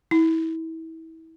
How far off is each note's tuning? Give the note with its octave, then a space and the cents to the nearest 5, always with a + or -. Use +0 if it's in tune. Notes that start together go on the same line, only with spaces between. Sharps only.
E4 -30